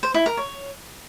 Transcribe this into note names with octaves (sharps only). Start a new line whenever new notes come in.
C5
E4
A#4
C#5